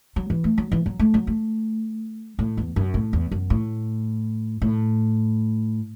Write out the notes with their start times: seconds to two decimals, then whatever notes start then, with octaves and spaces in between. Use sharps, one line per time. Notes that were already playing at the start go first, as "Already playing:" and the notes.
0.16 F#3
0.30 E3
0.44 A3
0.58 F#3
0.72 E3
0.86 F#3
0.99 A3
1.14 F#3
1.27 A3
2.39 A2
2.57 E2
2.76 F#2
2.94 A2
3.13 E2
3.32 F#2
3.50 A2
4.62 A2